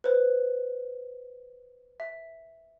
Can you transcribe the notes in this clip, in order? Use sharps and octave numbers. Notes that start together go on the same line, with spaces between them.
B4 C5
E5